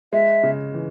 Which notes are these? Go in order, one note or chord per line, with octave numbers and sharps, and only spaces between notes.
G#3 E5
C#3
E3